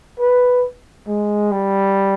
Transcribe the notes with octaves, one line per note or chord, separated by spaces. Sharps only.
B4
G#3
G3